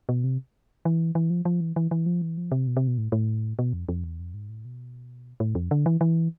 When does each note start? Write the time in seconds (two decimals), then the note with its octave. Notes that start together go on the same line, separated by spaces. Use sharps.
0.09 B2
0.24 C3
0.85 E3
1.15 E3
1.30 F3
1.45 F3
1.60 E3
1.76 E3
1.91 E3
2.06 F3
2.22 E3
2.37 F3
2.52 C3
2.67 B2
2.77 C3
2.87 B2
2.98 A2
3.12 A2
3.59 B2
3.73 F2
3.89 F2
4.04 E2
4.20 F2
4.34 G#2
4.49 A2
4.65 B2
5.40 A2
5.55 F2
5.71 D3
5.86 E3
6.01 E3